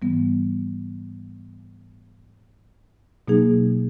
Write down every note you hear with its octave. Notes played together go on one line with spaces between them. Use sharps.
G#2 E3 G3 B3
B2 F#3 A#3 D#4 G#4